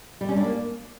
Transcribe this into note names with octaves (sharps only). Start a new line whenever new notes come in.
G3
C#4
D4
A#3